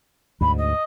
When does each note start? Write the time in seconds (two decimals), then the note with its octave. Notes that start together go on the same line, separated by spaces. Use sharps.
0.41 D2 G#2 B5
0.58 D#5